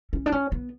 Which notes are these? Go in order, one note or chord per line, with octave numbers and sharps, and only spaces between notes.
C#4
D4
C#4
B3